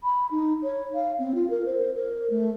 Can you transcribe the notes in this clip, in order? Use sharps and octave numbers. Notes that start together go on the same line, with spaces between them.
B5
D#4
C#5
F5
C4
F4
A#4
C5
A#4
A3